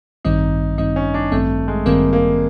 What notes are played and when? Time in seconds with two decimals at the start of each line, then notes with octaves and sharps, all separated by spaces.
0.25 A1 G2 D#3 G3 C4 D#4
0.78 A1 G2 D#3 G3 C4 D#4
0.96 C#4
1.14 D4
1.32 A1 G2 D#3 G3 A3 C4
1.68 G#3
1.86 A1 G2 D#3 G3 A#3 C4
2.13 A#3